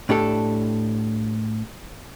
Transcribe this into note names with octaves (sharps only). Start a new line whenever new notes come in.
A2 D4 G4 A4